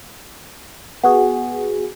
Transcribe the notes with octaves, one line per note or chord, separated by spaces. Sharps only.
B3 F#4 G#4 F#5